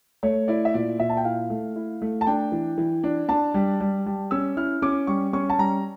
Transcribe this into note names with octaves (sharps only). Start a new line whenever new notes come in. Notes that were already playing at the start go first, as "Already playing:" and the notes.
A3 C#5
E4 D5
E5
A#2 D5
A#2 E5
A5
G5
E4 F5
A3
E4
A3
A5
D4 G5
E3
E3
D4
D4 A5
G3
G3
G3
C#4 E6
E4 F6
C#4 D6
G3 C#6
C#4 C#6
A5
G3 A#5